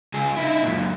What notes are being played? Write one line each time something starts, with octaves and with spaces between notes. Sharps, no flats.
C#2 G#4
D#4 E4
F#2 A#2